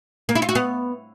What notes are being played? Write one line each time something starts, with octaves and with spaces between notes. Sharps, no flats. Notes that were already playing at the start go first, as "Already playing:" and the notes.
A#3
E4
F4
F#4
B3